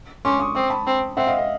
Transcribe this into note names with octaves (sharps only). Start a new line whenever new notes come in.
C#4 C6 D6
C#6 D#6
C4 C#6 D#6
A5 B5
C4
C4 E5 F#5
D#5 F5
D#5